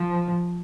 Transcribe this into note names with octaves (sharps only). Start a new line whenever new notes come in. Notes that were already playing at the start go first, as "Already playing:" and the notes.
Already playing: F3